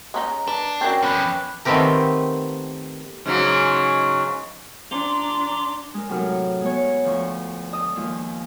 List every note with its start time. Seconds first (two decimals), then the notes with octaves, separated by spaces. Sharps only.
0.14 G#3 C#4 D#4 A#5
0.47 D4 B4
0.81 F#3 C4 C#4 A#4 G5
1.02 F2 B3 C#4 B5 D6 F#6
1.65 D#3 A3 B3 C4 G4 A#4
3.26 G#2 C#3 F#3
4.91 D4 A#5 C6 D6
5.94 G#3 A#4
6.09 A2 C3 F#3 D#4 A#4 F6
6.61 G#3 B3 C#5
7.05 D2 F3 F4 C#6
7.73 D#5 A5 D#6 E6
7.96 D#2 F3 G#3 F4